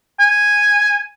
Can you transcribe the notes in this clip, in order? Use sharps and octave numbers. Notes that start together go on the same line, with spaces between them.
G#5